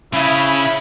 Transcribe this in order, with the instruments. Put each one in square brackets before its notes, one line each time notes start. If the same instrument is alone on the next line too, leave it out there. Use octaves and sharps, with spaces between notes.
[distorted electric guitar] C#3 [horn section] F3 D4 B5 [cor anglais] E4 [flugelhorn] E5